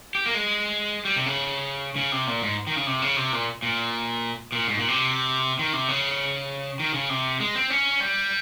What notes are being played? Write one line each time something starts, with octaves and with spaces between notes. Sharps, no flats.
G4
A#3
G#3
G3
C3
C#3
C#3
C3
A#2
G#2
D#3
C#3
C3
C#3
C3
A#2
A#2
A#2
G#2
A#2
C3
D#3
C3
C#3
D#3
C#3
C3
G#3
C4
C#4
G3